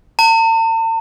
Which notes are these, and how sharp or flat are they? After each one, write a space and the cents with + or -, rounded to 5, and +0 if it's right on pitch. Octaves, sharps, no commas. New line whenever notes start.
A5 +45